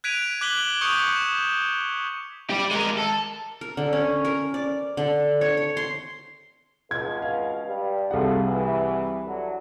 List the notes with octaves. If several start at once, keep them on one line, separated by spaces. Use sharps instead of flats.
F#6 G#6 B6 D7 D#7 F7
D6 F#6 G#6 B6 F#7 G7
C#6 D#6 G6 C#7 F7
E7
G4 D5
G#3 A#4
A4
A#4
D3
C#4
A#4
D5
D3
C#5
C#5
C6
C#2 B2 G#3 G#6
F5
G2 G3
C2 E4 F4 G#4 A4 F#5
E3
D3 E3 F#3